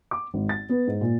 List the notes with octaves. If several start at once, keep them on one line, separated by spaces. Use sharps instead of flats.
D6
G#1
A6
B3
G#2
A#2